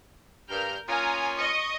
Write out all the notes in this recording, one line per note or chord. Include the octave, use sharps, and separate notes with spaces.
G2 A#4 F6 G6
A#3 C#4 F4 G#5 A#5 D#6
D#5 C#6 D#6